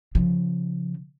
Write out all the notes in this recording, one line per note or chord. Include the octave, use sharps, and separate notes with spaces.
C#3 F3